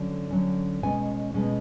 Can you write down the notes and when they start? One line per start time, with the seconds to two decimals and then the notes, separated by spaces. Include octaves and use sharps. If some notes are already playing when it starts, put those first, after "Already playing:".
Already playing: D3 F#3 C#4
0.31 D3 F#3 C#4
0.82 B2 G#3 C#4 G#5
1.34 B2 G#3 C#4